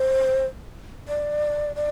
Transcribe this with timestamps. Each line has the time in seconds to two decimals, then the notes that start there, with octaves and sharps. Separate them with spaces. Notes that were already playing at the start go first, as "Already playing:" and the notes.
Already playing: C5
1.08 D5
1.76 D5